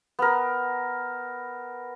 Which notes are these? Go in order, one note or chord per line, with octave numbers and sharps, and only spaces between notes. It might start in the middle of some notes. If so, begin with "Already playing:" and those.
B3 A#4